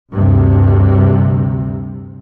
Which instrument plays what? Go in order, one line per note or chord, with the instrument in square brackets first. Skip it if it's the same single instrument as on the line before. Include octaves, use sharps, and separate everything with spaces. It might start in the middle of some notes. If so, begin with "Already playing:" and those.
[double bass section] D2 G2 C3